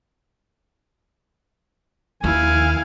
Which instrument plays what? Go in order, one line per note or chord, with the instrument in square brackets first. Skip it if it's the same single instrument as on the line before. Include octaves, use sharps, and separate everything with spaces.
[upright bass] D#2 [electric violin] E4 F5 [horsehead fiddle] G#5